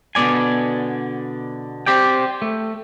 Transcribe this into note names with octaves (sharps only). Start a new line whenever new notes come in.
B2 D3 B3 D5 G#5
C4 G4 D5 G5
A3